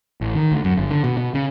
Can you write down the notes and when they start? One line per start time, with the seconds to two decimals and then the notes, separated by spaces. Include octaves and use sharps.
0.21 A1
0.35 D#3
0.52 D2
0.64 F#2
0.78 G1
0.91 D3
1.04 B2
1.17 B2
1.34 C#3